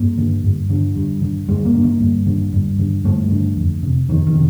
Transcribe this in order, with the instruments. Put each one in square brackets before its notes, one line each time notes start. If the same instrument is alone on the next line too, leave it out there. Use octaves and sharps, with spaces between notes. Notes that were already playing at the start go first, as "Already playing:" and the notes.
Already playing: [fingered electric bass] G2 A#3
D3
G2
D3
G2
D3
G2 G#3
A#3
D3
A#3
G2
D3
G2
D3
G2 A3
D3
F2
C3
F2 D#3
D#3
C3